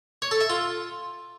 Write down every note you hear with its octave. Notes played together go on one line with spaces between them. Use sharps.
C#5
A4
E5
F4